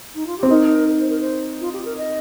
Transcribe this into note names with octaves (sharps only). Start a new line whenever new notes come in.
D#4
F4
C4 G4
D#4 A#4
C5
A#4
C5
F4
G4
A#4
D#5